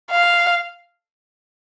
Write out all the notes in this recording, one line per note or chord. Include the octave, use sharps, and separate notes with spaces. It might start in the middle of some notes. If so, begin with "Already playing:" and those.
F5